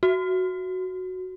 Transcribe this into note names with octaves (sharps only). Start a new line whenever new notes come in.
F#4